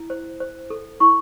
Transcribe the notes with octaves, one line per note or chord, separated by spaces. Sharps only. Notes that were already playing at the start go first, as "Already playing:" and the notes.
Already playing: E4
C5
C5
A4
E4 C#6